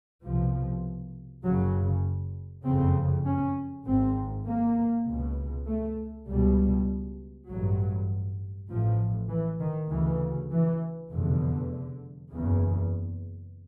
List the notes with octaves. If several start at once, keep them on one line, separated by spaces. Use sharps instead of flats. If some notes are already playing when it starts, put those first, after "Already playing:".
C2 B2 F3
F#1 F#2 C#3 F#3
F#1 F2 C#3 C4
C#4
G#1 G#2 C4
A#3
C#2 B2
A3
C#2 B2 G3
A1 G2 F#3
A1 A2 F3
E3
D#3
D2 C#3 E3
E3
F1 E2 B2 D3
F#1 E2 C#3